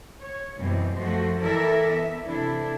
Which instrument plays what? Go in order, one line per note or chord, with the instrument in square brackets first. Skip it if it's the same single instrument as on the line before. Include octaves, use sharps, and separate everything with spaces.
[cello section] C#5
F#2 B2 E3 G3 C4
F#2 F3 A3 F#4 C5
E3 E4 A4 A#4 D5 E5
B3 E5
C3 E3 D4 E4 A4